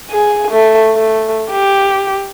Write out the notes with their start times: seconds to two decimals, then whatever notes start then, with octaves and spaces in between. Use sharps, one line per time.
0.11 G#4
0.51 A3
0.95 A3
1.51 G4